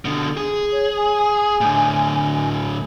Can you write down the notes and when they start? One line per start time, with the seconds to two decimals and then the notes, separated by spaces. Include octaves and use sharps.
0.05 B2 D3
0.37 G#4
0.72 C#5
0.96 G#5
1.61 A2 D3